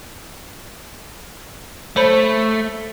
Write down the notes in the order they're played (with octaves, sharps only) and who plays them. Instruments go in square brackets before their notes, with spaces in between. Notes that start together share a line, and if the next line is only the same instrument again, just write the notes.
[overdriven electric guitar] A3 [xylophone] C5 C#5 B5